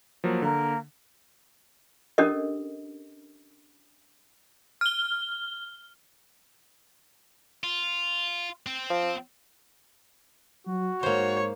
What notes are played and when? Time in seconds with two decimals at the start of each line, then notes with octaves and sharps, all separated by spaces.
0.24 F3 F#3 A#3
0.42 D3 A#3
2.18 C#4 D4 G4 A4 A#4 D#5
4.81 F6 G7
7.64 F4
8.66 C4
8.90 F3
10.67 F#3 F#4
11.03 G#2 A#3 C5 C#5